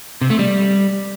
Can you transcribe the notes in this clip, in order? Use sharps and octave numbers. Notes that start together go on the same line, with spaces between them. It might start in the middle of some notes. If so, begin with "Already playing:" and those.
C3
A3
G3